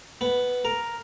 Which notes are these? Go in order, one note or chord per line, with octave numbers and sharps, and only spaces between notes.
B3
A#4